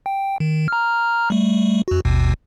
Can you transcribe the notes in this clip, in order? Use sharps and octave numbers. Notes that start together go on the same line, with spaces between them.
G5
D#3
A#5 F6
G3 A3
F2 F#4
G#1 D#2 B2